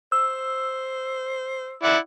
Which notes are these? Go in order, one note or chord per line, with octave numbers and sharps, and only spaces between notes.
C5 E6
E4 D5 F#5